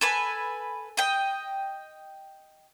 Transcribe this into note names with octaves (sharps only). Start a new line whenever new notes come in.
A4 B4 G#5
D#5 G5